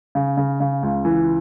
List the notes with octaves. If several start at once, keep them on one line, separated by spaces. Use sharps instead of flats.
C#3
C#3
C#3
C#2
E3